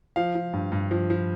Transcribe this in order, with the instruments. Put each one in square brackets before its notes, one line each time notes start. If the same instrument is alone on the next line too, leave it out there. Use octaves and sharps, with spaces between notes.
[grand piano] F3 F5
F3
G2
G2
F3
F3